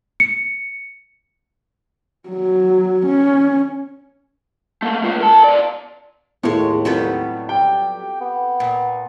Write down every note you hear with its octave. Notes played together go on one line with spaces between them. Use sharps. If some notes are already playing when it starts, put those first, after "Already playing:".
C#7
F#3
C#4
A3 A#3
G#3 F4
A#4 A5
B2 D5
D#2 A2 G#3 B3 A4 C#5
F#3 G3 B3 C4 F4 A4
G4 G5
B3
A#2